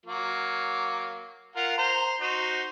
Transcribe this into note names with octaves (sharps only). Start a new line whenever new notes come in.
F#3 A#3
F4 A#4 F#5
C5 A#5
D#4 F#4 C5